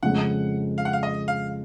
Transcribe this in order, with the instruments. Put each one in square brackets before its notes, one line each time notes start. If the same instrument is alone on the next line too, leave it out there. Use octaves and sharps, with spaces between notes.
[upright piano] F2 C#3 G#3 [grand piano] F#5
[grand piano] F5
F#5
F5
D#5
F5